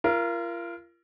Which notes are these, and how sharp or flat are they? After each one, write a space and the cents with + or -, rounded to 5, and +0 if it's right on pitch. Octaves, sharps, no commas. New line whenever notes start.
F4 -35 A#4 +10